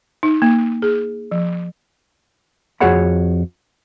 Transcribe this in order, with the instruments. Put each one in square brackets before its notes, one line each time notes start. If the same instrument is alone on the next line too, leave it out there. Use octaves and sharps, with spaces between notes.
[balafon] D#4
A#3
G#4
F3
[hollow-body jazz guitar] F2 F#4 G#4 C#5 F#5 B5